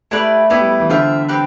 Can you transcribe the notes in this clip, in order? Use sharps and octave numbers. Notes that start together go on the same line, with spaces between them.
A3 E4 G4 B4 D5
B3 E4 G4 D5
G3
E3
D3 F4 C5 E5 G5
C4 G4 B4